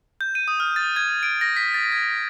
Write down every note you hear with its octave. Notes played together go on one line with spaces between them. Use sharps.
G6
D#7
D#6
F6
A6
G#6
D7
A#6
B6
A6
G#6